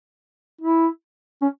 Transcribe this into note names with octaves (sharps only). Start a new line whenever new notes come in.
E4
C#4